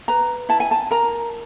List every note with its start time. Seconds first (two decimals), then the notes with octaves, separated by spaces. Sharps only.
0.08 B4 A#5
0.49 E4 A5
0.60 G#5
0.71 A5
0.91 A#4 A#5